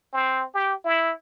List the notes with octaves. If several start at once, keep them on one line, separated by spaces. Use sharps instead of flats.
C4
G4
E4